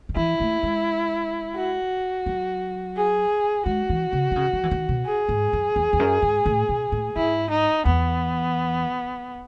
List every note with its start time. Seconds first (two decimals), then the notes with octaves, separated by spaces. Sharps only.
0.09 D#3
0.16 E3 E4
0.40 A3
0.63 G#3
1.56 F#4
2.26 F#3
2.96 G#4
3.66 G#3 F#4
3.90 E3
4.12 C#3
4.32 D#3
4.36 C#3
4.53 F#3
4.63 E3
4.71 D#3
4.89 B2
5.06 G#4
5.29 G#2
5.53 F#2
5.76 E2
5.93 E2
5.99 F#2
6.22 G#2
6.46 A2
6.69 B2
6.92 A2
7.16 G#2 E4
7.50 D#4
7.85 E2 B3